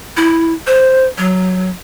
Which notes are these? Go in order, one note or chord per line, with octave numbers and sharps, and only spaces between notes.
E4
C5
F#3